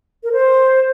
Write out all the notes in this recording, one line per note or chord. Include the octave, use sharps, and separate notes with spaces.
A#4
C5